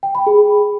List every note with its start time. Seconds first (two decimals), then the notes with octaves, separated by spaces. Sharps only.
0.03 G5
0.15 B5
0.27 G#4